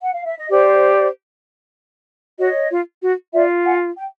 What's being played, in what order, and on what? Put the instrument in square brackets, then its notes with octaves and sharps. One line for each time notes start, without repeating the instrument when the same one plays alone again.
[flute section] F#5
F5
E5
D#5
[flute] G4 [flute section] C5 D5
[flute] F#4 [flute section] C#5 D#5
[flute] F4
F#4
[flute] F4 [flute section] D5 E5
[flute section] F#5 G#5
G5